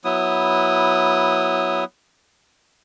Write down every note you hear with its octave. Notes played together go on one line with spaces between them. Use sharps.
F#3 B3 E4 D#6